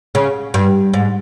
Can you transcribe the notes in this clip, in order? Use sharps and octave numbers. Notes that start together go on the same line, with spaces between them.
C#3
G2
G#2